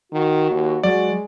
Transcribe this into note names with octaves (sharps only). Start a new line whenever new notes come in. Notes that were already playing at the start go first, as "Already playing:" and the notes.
D#3 F#4
D#2
F#3 G#3 F#4 D5